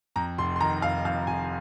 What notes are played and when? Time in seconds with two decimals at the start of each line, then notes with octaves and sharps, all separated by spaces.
0.16 F2 A#5
0.38 F1 C6
0.56 C6
0.61 D#3 A#5
0.82 F1 F5
1.05 F2 F5
1.27 F1 G#5